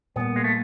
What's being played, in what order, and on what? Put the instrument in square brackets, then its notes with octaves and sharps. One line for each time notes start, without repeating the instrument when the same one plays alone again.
[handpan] A#2 G3 A#3 [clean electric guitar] B3
[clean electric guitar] G#3
A3